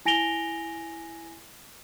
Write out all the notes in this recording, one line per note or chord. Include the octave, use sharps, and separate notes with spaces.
E4 G#5 A#6 D7 F7 G7